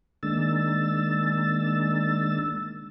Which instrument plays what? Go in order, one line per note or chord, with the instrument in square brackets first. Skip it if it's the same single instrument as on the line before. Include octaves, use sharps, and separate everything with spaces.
[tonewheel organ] D#3 G#3 A#3 D4 E6 A6